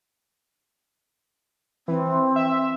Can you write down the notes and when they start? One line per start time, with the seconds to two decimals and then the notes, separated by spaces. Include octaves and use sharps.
1.88 E3 C4
2.36 E5